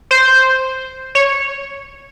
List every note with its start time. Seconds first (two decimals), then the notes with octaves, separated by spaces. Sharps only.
0.11 C5
1.15 C#5